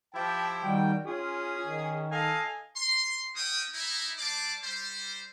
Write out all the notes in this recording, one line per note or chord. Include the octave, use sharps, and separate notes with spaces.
F3 E4 G4 G5 A5
D#3 G3 F#4 G5
C#4 F4 G#4
D#3
A4 D#5 F5 G#5
C6
C#4 F#4 G5 D#6
D#4 E4
G3 D5 A5 C6 D6
G3 C5